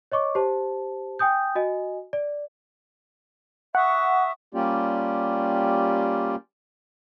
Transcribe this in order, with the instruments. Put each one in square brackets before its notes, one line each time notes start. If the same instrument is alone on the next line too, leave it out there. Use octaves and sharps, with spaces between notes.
[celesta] C#5 D#5 C#6 D6
G4 C5 A5
G5 G#5 D#6 G6
F#4 D#5 G#5
D5
[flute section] E5 C#6 D#6 [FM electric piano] F#5
[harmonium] G3 A#3 C#4 F4 G4 D5